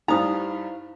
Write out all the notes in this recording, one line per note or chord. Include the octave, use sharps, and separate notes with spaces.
G2 G3 D#4 E4 C5 F5 A#5 D#6